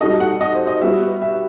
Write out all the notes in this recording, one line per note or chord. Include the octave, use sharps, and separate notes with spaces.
G3 D#4 F#4 A4 D#5
F#5
D#5
C5
D#5
G3 B3 F#4 E5
E5